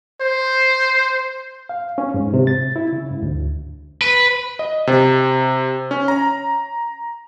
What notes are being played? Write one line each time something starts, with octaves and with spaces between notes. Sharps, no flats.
C5
F5
C#4
G#2
C3
A6
E4
C#3
G#2
D2
B4
D#5
C3
C#4
A#5